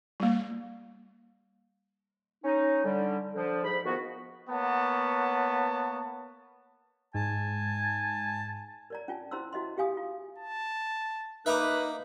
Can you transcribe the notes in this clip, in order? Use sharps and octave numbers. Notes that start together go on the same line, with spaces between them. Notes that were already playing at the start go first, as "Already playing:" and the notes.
G3 A#3
C#4 D#4
D3 G3
D3 F3
G#2 B5
D#3 F3 A#3 B3 F#4
A#3 B3 C#5 F#5 A5
G#2 G#5 A5
A#4 D5 A#5
C#4 F4 G#5 A5
C#4 E4 C5 A#5 C6 E6
E4 F#4 D#5 E5 C6
G4 G#4 F5 G#5 D#6
F4
A5
A#3 D#4 B4 E5 A#5 D6 F#6